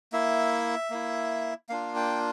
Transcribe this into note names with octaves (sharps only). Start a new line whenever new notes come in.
A#3 E4 E5
A#3 E4
A#3 D4 F4 F5
G5